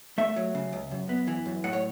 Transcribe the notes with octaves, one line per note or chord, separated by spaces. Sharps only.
A3 E5
F#3
C#3
C#2
F#2
B3
E3
F#2
A2 F#5
C#5